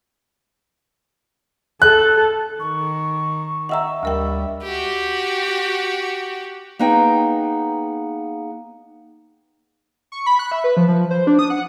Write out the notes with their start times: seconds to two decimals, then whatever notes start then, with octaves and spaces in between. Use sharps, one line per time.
1.82 A4 F#6
2.60 D#3 C#6
3.69 D#5 E5 F#5 G5 A#5
4.03 D2 G3 A#4 G5
4.63 F#4 G4
6.79 A#3 B3 D#4 G#4 G5
10.12 C#6
10.26 B5
10.39 F#6
10.52 E5
10.64 B4
10.77 F3
10.88 F3
11.11 C5
11.27 D4
11.39 D#6
11.50 F#5